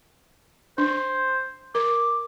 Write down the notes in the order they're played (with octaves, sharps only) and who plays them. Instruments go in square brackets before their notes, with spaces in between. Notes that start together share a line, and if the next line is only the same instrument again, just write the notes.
[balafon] D4 [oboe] C5
[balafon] A#4 [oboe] D6